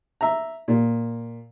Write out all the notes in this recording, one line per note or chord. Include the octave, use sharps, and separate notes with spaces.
E5 A#5
A#2